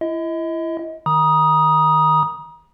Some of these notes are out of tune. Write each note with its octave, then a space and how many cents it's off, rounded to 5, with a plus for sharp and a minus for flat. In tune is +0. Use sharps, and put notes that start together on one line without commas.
E4 +30 D#5 +35
D#3 +0 A#5 +35 D#6 +0